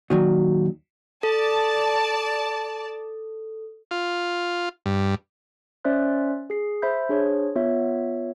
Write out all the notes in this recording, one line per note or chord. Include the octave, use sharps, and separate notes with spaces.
A#2 D#3 F#3 F#4
A4 D5 A5
F4
G2
C#4 C5 D5 E5 C6 F#6
G#4 C7
C5 E5 B5 G6
D4 G#4 C5 C#5
B3 F4 C#5 E5